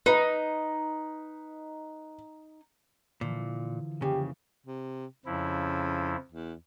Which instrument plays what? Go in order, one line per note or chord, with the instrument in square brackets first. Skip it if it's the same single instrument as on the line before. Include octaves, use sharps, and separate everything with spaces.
[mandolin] D#4 [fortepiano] B4
[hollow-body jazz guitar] A#2 [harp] D3 E3 F3
[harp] F2 E3 A#3 [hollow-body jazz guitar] C#3 [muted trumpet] G4
[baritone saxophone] C3
[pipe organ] F2 F3 E4 [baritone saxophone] C#3
[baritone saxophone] E2